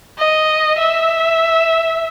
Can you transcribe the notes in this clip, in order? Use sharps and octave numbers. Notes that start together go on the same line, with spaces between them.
D#5
E5